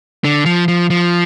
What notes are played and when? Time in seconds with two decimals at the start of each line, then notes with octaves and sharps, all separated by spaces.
0.24 D3
0.46 F3
0.68 F3
0.90 F3